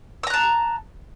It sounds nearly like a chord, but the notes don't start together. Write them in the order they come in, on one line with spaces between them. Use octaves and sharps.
E6 A#5 F#6 A5